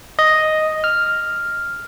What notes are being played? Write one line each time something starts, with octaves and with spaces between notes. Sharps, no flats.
D#5
F6